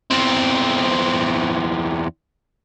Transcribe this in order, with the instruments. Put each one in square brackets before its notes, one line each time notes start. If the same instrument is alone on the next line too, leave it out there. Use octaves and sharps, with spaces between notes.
[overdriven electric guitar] E2 C4